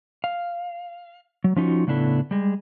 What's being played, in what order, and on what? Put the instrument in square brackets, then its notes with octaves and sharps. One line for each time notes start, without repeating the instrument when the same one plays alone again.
[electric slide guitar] F5
F#3
F3 C#4 D#4 F4 F#4
A2 C#3 B3 D4 E4 A4
G3 G#3